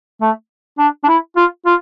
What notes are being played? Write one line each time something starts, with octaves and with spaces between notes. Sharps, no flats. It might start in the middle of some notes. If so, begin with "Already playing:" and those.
A3
D4
D4
E4
F4
F4